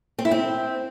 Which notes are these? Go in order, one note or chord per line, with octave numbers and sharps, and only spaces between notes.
C4
E4
C4